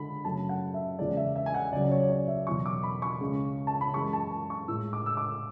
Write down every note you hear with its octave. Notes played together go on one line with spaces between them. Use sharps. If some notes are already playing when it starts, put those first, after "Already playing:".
Already playing: D3 G#3 B5
F#2 C#3 F#3 A3 A5
F#5
E5
E2 C#3 G#3 D5
E5
E5
G#5
F#5
C#2 C#3 F#3 D5
C#5
D5
E5
E2 B2 F#3 C#6
D6
B5
C#6
C#2 C#3 G#3
A5
B5
F#2 E3 G#3 C#6
A5
A5
C#6
A2 G#3 E6
D6
E6
D6